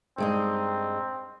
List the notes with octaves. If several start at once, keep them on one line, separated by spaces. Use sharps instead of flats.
G2 G#3 C4 D#4